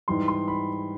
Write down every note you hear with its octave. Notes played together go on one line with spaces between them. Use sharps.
G#2 E3 G3 C6
C6
B5